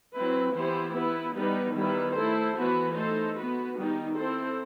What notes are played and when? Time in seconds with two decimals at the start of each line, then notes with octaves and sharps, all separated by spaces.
0.15 F#3 C4 E4 B4
0.55 E3 B3 E4 G4 C5
0.95 B3 E4 B4
1.35 G3 B3 D#4 G4 B4
1.75 D#3 G3 B3 E4 B4
2.15 A3 E4 A4 C5
2.55 E3 B3 F#4 B4
2.95 A3 D#4 A4 C5
3.36 B3 F#4 B4
3.76 D#3 G3 B3 D#4
4.16 C4 E4 A4 C5